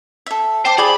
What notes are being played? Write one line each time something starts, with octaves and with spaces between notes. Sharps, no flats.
A4 E5
C5 G5 A5 D6
G4 G#4 C5 D5 G#5 B5